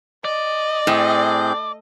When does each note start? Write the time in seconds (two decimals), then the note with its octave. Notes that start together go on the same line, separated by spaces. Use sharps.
0.25 D5 D#5
0.87 A2 C4 G#4 G6